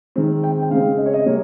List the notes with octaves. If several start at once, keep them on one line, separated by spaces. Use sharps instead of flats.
D#3 G#3 C4
G5
G5
C#3 G#3 C4 F5
D#5
C#5
D#5
C3 G3 A#3 C#5